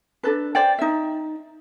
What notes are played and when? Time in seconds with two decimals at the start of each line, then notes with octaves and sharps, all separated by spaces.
0.23 D4 A4 B4
0.55 C5 D5 G5
0.79 D#4 E5